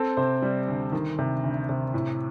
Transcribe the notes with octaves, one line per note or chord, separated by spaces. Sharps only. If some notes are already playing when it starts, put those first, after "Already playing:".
Already playing: C4 A4
C3 C5
G3
D2
D#3
C3
D2
C3
A2